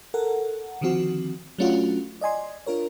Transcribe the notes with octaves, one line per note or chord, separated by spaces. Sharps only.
A4 A#4 F#5
D3 D#3 F3 C4 F#4
F#3 A3 C#4 D4 F4 F#4
D5 D#5 G#5 C6
D4 F4 A#4 C#5